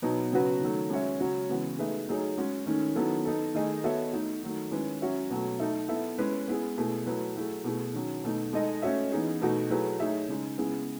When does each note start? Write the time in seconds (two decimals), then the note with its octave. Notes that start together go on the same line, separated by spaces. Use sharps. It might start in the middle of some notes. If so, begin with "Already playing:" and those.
0.02 B2 F#3 B3 D#4
0.32 C#3 F#3 B3 F#4 B4
0.61 D#3 F#3 A3
0.90 G#3 C#4 F#4 C#5 E5
1.20 C#3 F#3 C#4 F#4 C#5
1.49 C#3 E3 G#3 B3 F#4
1.79 A3 D#4 G#4 B4 E5
2.08 F#3 A3 D#4 G#4 C#5
2.37 G#3 C#4 F#4
2.66 D#3 A3 C#4
2.95 D#3 F#3 B3 E4 A4
3.25 B3 D#4 A4
3.54 D#3 A3 D#4 G#4 D#5
3.84 B3 F#4 A4 C#5 E5
4.13 A3 D#4 F#4
4.43 D#3 F#3 A3
4.71 D#3 G#3 C#4 E4 B4
5.02 F#3 C#4 F#4 C#5 E5
5.30 B2 F#3 A3
5.59 A3 D#4 A4 E5
5.89 B3 E4 A4 E5
6.18 G#3 C#4 E4 B4
6.48 B3 E4 G#4
6.78 B2 A3 E4 G#4
7.06 F#3 A3 E4 B4
7.35 F#3 A3 E4 G#4
7.64 B2 A3 E4 G#4
7.94 D#3 F#3 C#4
8.24 B2 A3 D#4
8.53 G#3 D#4 A4 D#5
8.82 A3 C#4 F#4 C#5 E5
9.12 E3 B3 D#4 G#4
9.41 B2 A3 D#4 F#4
9.70 F#3 A3 E4 G#4 B4
9.99 A3 D#4 G#4 C#5 E5
10.28 C#3 G#3 D#4
10.58 C#3 G#3 B3 E4 G#4